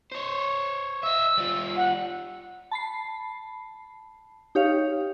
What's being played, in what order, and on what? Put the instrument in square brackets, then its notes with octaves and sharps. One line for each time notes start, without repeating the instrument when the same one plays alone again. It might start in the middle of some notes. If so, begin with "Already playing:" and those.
[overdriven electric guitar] C5 C#5
[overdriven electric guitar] D#5 E5 [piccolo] E6
[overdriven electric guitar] G3 F4
[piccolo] F#5
[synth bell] A5 B5 C7
D#4 G4 C#5 F5